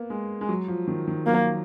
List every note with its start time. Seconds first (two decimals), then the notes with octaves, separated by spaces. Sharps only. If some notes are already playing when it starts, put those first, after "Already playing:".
Already playing: A#3 B3
0.10 G#3
0.41 G#3
0.49 F#3
0.68 F3
0.88 D#3
1.07 D#3
1.27 F#3 A#3